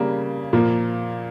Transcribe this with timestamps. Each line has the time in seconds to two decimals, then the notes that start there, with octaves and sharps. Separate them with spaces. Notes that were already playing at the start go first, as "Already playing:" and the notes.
Already playing: C#3 G3 A#3
0.53 A#2 F3 A#3